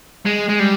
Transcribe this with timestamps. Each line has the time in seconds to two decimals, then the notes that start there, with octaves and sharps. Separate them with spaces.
0.25 G#3
0.49 G#3
0.59 G3